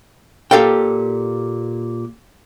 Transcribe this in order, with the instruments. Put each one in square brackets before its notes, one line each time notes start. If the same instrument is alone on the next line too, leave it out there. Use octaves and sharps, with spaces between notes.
[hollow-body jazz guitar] A#2 G4 A4 F5 G5